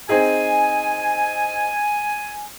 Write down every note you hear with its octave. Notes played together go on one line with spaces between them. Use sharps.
C4 D#4 G#4 G#5